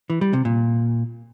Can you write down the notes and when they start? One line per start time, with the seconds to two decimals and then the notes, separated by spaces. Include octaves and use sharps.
0.10 E3
0.21 G3
0.33 C3
0.45 A#2